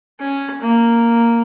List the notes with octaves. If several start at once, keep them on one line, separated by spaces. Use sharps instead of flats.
C#4
A#3